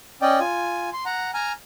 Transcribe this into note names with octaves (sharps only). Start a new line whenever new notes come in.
C#4 D5 D#5 G5
F4 G#5
C6
F#5 A#5
G#5 A#5 F6